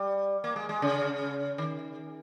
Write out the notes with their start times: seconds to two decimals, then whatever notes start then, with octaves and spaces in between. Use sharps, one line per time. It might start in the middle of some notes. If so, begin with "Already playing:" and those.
Already playing: G3
0.44 A#3
0.56 G#3
0.69 G#3
0.82 C#3
1.58 D#3